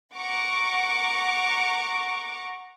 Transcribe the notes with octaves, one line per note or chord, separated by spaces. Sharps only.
F#5 A#5 C#6 D6